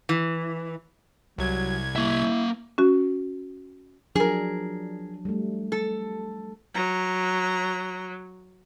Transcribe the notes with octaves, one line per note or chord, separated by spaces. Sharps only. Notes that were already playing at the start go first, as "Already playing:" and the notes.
E3
C2 F#3 G#6
A#3 E4 E5
C#4 F#4
F3 F#3 D4 G#4 A#4
G3 A3
A4
F#3 A#5